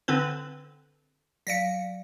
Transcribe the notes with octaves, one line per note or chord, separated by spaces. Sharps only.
D3 C4 B4
F#3 D5 F5 A#6 B6 C#7